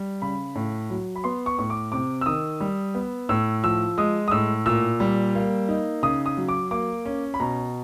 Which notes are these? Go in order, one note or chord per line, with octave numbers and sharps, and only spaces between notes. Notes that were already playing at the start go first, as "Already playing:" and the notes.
Already playing: G3
C#3 B5
A2
F#3
B5
B3 C6
C#6
A2 C#6
D6
C3 D6
E6
D#3 D#6
G3
B3
A2 E6
F3 E6
G#3 D#6
D#6
A2 E6
A#2 E6
G3
A#3
D#4
C#3 D#6
D#6
F#3
D6
A#3 D6
C#4
B5
B2 A#5